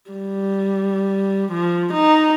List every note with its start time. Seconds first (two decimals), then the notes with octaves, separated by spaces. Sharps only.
0.11 G3
1.52 F3
1.93 D#4